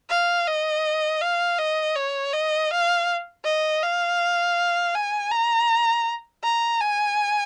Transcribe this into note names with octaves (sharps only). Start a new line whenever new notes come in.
F5
D#5
F5
D#5
C#5
D#5
F5
D#5
F5
G#5
A#5
A#5
G#5